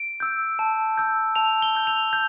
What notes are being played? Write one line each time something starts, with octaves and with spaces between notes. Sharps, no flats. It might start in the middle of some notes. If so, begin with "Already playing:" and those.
Already playing: D7
E6 G6
A5
E6 G6
A5 F7
G7
E6 G6
F7
G6